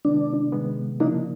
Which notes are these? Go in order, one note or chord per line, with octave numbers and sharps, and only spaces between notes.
C3 D#3 G#3 B3 D4
C3 D#3 G#3 B3
C#3 F3 A#3 D4 D#4